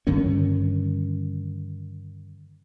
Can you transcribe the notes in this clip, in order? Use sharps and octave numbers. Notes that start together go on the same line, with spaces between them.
G2 D3 D#3 C#4